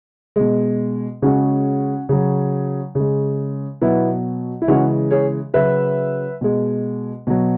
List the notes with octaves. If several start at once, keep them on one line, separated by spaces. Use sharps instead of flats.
B2 G#3
C#3 G#3 C#4 F#4
C#3 F#3
C#3 G#3
B2 F#3 B3 E4
E4
C#3 E3 G#3 C#4 F#4
G#4 C#5
C#3 F#3 B4 E5
B2 G#3
B2 F#3